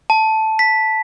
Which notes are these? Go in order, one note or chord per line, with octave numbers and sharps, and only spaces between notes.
A5
B6